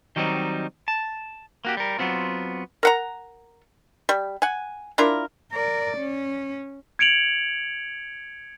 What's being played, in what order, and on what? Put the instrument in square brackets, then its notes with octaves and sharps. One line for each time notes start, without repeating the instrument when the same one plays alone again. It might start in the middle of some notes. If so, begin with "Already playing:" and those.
[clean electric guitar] D#3 F#3 G3 C4 D#4
A5
A#3 F#4 G4
G3 A#4
F#3 B3 C4 F4
[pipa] A#4 F#5 A#5
G3
F#5 G#5
D4 E4 F4 A#4
[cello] A#4 D5
C#4
[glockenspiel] G#6 C#7 D7 F7 F#7